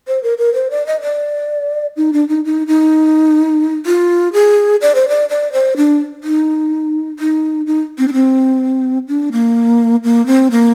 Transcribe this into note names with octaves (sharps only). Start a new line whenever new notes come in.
C5
A#4
A#4
C5
D5
D#5
D5
D#4
D4
D#4
D#4
D#4
F4
G#4
D5
C5
D5
D5
C5
D4
D#4
D#4
D#4
C4
D4
C4
D4
A#3
A#3
C4
A#3